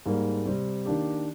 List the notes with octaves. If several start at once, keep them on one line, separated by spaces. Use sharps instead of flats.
G#2 G3 A#3
C3 G3 C4
D#3 A#3 D4 G4